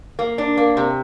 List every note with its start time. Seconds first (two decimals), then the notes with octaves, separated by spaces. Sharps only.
0.19 A#3
0.38 D4
0.57 A#3
0.77 C3